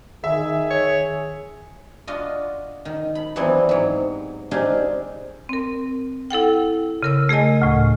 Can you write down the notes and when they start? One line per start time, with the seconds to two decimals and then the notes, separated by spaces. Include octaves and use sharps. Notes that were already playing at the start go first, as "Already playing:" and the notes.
0.24 D#3 G#4 E5
0.71 C#5
2.07 D4 F4 F#4 D#5
2.85 D#3
3.15 B5
3.36 E3 F#3 G3 B3 C4 D4
3.69 G#2 F#3
4.51 C4 D4 D#4 F4 G4 G#4
5.49 C4 A#4
6.31 E4 A4 F#5 G5
7.03 C#3 A#4 E6
7.29 A3 G#4 A#4 D#5 G#5
7.62 D2 A2